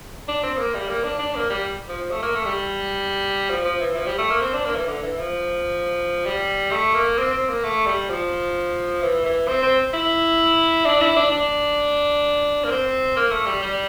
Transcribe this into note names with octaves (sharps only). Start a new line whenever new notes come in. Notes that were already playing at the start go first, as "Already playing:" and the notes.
D4
C4
A#3
G3
A#3
D4
D4
A#3
G3
F3
A3
A#3
A3
G3
F3
F3
E3
F3
G3
A3
A#3
C4
D4
A#3
E3
D3
E3
F3
G3
A3
A#3
C4
C4
A#3
A3
G3
F3
E3
E3
C4
C4
E4
D4
E4
D4
D4
A#3
C4
A#3
A3
G3
G3